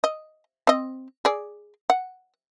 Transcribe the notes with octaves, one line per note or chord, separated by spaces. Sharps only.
D#5
C4 D#5
G#4 D5
F#5